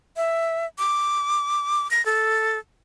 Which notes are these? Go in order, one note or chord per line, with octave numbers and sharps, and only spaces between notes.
E5
D6
A#6
A4